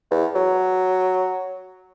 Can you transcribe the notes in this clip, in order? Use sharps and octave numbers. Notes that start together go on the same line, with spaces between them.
E2
F#3